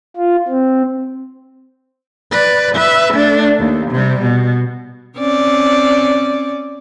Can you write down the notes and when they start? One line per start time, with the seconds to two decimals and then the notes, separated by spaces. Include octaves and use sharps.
0.16 F4
0.48 C4
2.31 B4 D5
2.75 B4 E5
3.14 A3 D4
3.59 D#2
3.91 C3 G3
4.22 B2
5.18 C4 C#4 D5